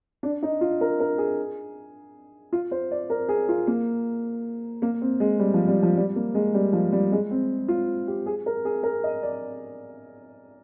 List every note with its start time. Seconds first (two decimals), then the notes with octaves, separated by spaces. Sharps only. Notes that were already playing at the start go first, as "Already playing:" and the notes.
0.23 D4
0.43 D#4
0.61 F4
0.81 A#4
1.00 A#4
1.18 G#4
2.53 F4
2.71 C5
2.91 D5
3.10 A#4
3.29 G#4
3.49 F4
3.67 A#3
4.82 A#3
5.01 C4
5.20 G#3
5.39 G3
5.54 F3
5.68 G3
5.83 F3
5.97 G3
6.16 A#3
6.35 G#3
6.54 G3
6.73 F3
6.92 G3
7.12 G#3
7.31 C4
7.68 F4
8.08 G4
8.26 G#4
8.46 A#4
8.65 G#4
8.83 A#4
9.04 D#5
9.23 D5